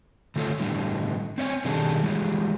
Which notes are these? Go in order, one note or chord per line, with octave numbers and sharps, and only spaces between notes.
D3 A3 F4 A4 C#5
A2 D3 E3 G3
C4 C#5 D#5 G#5
B2 D#3 G3 D4 G#4 A4
E3 G3 G#3